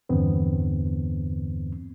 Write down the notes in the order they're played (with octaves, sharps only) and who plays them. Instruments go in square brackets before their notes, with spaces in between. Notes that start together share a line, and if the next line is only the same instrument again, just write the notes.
[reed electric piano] E2 G2 D3 E3 B3 C4